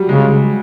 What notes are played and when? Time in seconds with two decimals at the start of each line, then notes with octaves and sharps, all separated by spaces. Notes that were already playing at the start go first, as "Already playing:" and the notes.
Already playing: F#3 G3
0.09 C#3 G#3